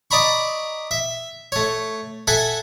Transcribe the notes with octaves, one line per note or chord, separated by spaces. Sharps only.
D5 D#5 A#5 B5 C#6
E5
A3 C#5
A4 E5 F#5 G#5